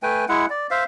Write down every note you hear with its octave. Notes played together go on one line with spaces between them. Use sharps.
A3 B4 G5 G#5
G#3 E4 F#5
D5
C5 E5 F5